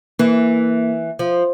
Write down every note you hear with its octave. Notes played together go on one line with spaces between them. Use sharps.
E3 A#3
F3